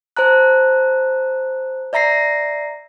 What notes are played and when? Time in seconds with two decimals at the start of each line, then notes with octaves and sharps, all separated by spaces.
0.17 C5 A5 A#5 F#6
1.93 D5 E5 A#5 A#6 C7